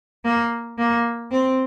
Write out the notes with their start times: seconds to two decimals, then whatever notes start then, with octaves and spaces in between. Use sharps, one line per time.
0.24 A#3
0.78 A#3
1.31 C4